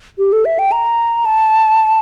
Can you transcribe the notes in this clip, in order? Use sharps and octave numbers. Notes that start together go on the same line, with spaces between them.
G4
A4
E5
G5
A#5
A5